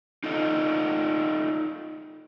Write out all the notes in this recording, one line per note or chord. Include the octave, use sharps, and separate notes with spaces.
D#4 F4 A4 D#5